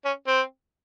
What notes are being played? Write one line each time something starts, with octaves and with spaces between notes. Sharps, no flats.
C#4
C4